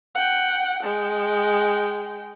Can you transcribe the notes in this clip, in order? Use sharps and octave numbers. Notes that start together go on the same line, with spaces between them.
F#5 G5
G#3 G5